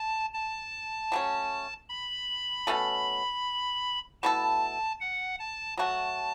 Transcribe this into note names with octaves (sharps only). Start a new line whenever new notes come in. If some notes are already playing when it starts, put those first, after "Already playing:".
Already playing: A5
A5
F#3 A3 C#4
B5
B2 A3 C#4 A4
B2 A3 E4 A4 A5
F#5
A5
F#3 A3 F#4 A5